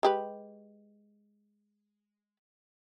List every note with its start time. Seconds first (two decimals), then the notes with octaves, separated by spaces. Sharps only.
0.03 G#3 G4 B4